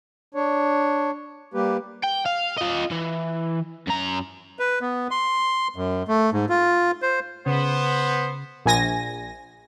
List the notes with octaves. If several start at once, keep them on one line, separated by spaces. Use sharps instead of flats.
D4 C#5
G3 A#3 G4 B4
G5
F5
F4 D#5
E3
F#2 A#5
B4
B3
C6
F#2
A3
G#2
F4
C5
C#3 B3 C5
A#1 G#5 A#6